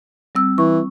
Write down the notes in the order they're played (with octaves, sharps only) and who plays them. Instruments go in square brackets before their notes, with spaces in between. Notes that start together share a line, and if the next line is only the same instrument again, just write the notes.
[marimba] G3 C4 E6
[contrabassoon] E3 [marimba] C#6